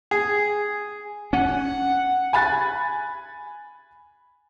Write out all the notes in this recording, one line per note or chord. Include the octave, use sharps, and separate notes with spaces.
G#4
C#4 F#5
G#5 B5 F#6 A6